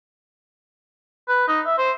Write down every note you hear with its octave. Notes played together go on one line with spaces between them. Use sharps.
B4
D#4
E5
C5